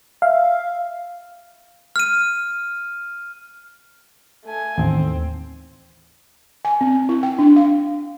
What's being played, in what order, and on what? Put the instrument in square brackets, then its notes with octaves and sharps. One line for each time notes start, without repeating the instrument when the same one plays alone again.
[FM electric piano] E5 F5
[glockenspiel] F6 D#7
[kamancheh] A3 G#5
[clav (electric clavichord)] A1 [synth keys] D#2 [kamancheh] C4
[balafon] G#5
C4
E4
G5
D4
F5